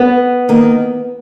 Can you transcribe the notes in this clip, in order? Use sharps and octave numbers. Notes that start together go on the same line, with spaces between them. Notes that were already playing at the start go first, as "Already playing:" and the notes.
Already playing: B3
D#3 A#3